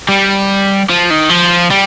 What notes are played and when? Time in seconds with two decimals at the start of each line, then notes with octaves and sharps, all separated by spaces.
0.09 G3
0.90 F3
1.11 D#3
1.30 F3
1.71 G3